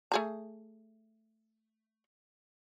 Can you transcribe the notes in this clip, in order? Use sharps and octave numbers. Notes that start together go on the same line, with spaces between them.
A3 G#4 A#5